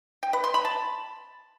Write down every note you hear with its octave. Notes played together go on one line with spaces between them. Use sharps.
G5
B4
C6
B5
A5